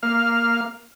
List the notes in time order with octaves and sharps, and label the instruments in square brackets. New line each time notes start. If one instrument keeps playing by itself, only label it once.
[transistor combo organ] A#3 F5 F6